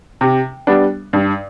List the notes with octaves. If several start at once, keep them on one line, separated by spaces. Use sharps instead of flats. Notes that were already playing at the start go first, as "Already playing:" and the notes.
C3
G3 B3 D4
G2